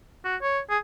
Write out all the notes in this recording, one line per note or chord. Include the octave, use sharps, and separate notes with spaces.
F#4
C#5
G#4